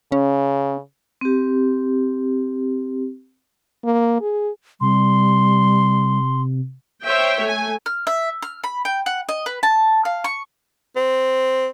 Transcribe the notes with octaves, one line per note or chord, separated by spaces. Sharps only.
C#3 C#4
C4 G4
A#3
G#4
C3 G3 C6
C5 C#5 E5 G5
A3 G#5
F6
E5
F6
B5
G5
F#5
D#5
B4
A5
F5
C#6
C4